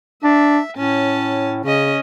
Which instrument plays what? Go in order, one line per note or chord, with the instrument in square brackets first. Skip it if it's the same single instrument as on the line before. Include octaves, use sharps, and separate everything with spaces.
[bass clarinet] D4 [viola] E5
[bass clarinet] A2 [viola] C#4 A5
[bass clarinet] C#3 [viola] C#4 D#5